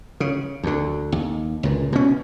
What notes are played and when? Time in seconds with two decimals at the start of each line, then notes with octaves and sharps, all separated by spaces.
0.20 C#3
0.63 D2 D3
1.12 D#2
1.63 C#2 A#2
1.93 B2 C#4